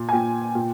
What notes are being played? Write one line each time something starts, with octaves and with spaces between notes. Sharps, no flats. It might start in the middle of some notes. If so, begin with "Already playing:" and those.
Already playing: A#2
G#5
A#2 G5
A#2